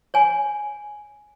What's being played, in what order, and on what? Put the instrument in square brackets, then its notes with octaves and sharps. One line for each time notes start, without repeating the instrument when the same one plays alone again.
[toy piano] C#5 G#5